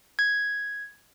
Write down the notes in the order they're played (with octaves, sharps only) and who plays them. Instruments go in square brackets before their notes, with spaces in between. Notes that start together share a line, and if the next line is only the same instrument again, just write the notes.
[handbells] G#6